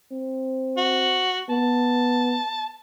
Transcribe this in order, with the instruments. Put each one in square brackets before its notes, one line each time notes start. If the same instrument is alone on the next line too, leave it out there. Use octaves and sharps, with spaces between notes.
[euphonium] C4
[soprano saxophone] F#4
[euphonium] B3 [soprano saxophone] A5